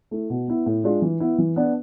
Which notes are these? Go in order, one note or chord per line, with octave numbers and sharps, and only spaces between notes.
A3 E4
B2
B3 E4
A2
G#3 D4 F4
E3
B3 E4
E3
B3 D4